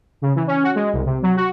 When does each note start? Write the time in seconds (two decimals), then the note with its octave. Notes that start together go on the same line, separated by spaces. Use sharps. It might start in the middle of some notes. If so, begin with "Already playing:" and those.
0.22 C#3
0.36 E3
0.47 C#4
0.63 F#4
0.75 G#3
0.93 C2
1.05 C3
1.23 F#3
1.36 F#4